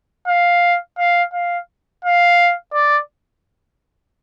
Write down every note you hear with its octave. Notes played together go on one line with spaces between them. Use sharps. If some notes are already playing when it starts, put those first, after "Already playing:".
F5
F5
F5
F5
D5